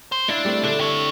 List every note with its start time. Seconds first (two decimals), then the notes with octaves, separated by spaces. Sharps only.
0.12 C5
0.28 D4 E4 F5
0.45 G3 A3 C4
0.64 D3 D4 A4
0.79 G4 C#5